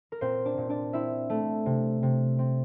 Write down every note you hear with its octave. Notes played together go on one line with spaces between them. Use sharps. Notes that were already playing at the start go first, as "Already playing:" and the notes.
A#4
A#2 C4 C5
D4 D5
A#2
D4 D5
C4 E4 E5
A3
C3
C3
C4